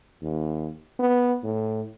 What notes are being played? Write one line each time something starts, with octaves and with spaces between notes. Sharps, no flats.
D#2
B3
A2